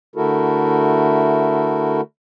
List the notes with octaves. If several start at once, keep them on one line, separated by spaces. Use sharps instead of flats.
D3 A3 E4 F#4 A4 A#4